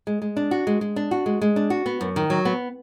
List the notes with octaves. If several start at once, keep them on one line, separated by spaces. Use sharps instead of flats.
G#3
G#3
D4
F#4
G#3
G#3
D4
F#4
G#3
G#3
D4
F#4
B3
F#2
D#3
F#3
B3